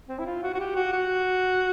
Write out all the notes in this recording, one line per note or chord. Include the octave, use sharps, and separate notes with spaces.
C4
E4
F4
F#4
F#4
G4
F#4
F#4